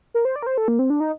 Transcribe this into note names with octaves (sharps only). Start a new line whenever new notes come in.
A#4
C5
D5
A#4
C5
A4
A#3
C4
D4
D#4